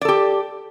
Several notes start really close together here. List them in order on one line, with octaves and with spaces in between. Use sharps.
D5 A4 G4